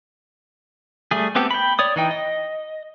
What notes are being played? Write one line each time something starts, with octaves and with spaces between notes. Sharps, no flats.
G3 A3 G#4
A3 B3 C4 G4 A4
G5 B5
C#5 D5 D#6
E3 D#4 G5
D#5